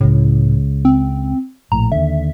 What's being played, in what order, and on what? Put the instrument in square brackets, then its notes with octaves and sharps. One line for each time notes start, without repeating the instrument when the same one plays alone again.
[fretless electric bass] C#2 C#3 [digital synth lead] A2
[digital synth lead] C4
[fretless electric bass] A#1 A2 [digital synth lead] A#5
[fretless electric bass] D#2 D3 [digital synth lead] E5